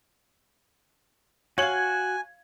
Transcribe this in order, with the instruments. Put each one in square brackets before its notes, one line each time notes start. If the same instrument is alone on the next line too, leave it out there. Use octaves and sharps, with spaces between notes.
[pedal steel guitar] F#4 [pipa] C#5 F5 [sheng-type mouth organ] G#5 [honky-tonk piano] G#6 F#7